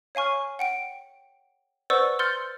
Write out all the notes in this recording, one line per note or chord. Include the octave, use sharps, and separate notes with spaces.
C#5 F5 G#5 C#6 F6
F#5 G5 D7
B4 C5 D5 F#5 C#6 E6
C6 F6 G6 A6 C#7